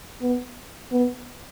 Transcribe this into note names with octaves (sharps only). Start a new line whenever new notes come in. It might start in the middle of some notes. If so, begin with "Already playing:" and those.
B3
B3